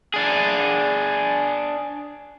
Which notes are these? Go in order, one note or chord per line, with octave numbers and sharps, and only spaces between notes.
D4 G#4